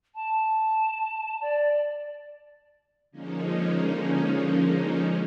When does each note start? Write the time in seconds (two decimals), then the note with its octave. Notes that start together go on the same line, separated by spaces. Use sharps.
0.15 A5
1.41 D5
3.11 D3 F3 G#3 A#3 C#4 D#4